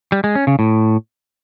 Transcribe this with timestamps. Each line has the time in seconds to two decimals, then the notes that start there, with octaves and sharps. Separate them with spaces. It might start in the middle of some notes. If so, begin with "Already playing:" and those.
0.12 G3
0.24 G#3
0.35 C#4
0.47 C#3
0.59 A2